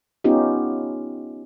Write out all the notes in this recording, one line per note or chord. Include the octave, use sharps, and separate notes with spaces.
B3 C#4 D#4 F4 G4